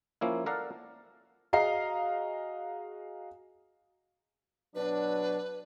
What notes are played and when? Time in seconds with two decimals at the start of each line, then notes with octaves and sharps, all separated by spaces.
0.21 F3 A#3 C#4 E4
0.46 A4 A#4 D5 F5 F#5
1.53 F#4 G#4 D#5 F5 A#5 C7
4.75 B2 F#3 D4 B4